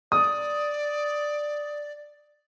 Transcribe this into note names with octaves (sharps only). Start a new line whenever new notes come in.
D5 D#6